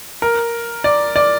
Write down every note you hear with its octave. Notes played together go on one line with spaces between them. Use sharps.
A#4
D5
D5